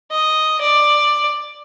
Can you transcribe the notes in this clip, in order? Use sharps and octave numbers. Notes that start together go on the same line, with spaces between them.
D#5
D5